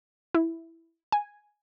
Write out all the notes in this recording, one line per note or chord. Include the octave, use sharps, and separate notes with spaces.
E4
G#5